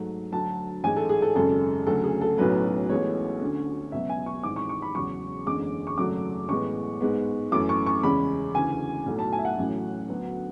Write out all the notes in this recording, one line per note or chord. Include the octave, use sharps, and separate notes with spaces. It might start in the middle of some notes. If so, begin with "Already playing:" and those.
Already playing: G#2 F#3 A3
D2 D3 F#3 A5
A1 G#2 G#3 G#5
A4
G#4
A4
G#1 F#2 C#3 G#3 C#4 A4
D2 C#3 F#3 A3 A4
G#4
A4
B1 A2 F#3 C#4 B4
A1 A2 G#3 B3 C#5
D2 D3 A3 C#4
C#2 B2 F#3 E5
G#5
C#6
G#1 G#2 E3 D6
C#6
C#6
B5
E1 E2 C#3 F#3 C#6
F#1 E2 D3 G#3 C#4 D6
C#6
G#1 F#2 C#3 F#3 A3 D6
A1 A2 G#3 B3 C#6
G#2 G#3 B3
F#2 E3 A3 C#4 D6
C#6
C#6
E2 C#3 G#3 C#4 B5
D2 C#3 E3 G#5
B1 A2 F#3 A3
A5
G#5
E5
F#5
A1 A2 F#3 C#4
D2 D3 F#3 B3